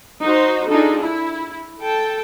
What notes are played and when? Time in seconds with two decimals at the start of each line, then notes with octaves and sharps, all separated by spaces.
0.23 D#4 F#4 C5
0.68 D4 D#4 F4 G#4 A4
1.01 E4
1.80 A4 G5 A5